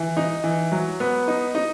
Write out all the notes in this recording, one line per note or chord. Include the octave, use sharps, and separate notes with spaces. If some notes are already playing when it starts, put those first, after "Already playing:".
Already playing: E3
D#4
E3
F#3
B3
D#4
D#4